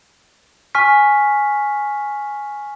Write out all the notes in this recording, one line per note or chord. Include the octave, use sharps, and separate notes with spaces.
G#5 C#6 F6 B6